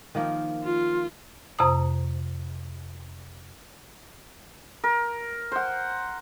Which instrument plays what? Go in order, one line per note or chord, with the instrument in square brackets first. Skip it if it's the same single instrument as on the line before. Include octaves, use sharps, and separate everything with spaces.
[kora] D#3 F3 A#3
[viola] F4
[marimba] F2 C3 C5 A#5 D#6
[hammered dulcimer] A#4
C5 F#5